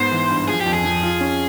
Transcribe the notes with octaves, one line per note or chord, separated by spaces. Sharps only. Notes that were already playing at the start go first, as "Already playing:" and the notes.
Already playing: G#2 B3 C5
E3
G2
F3 G#4
G4
F2
G#4
F2
F4
C#4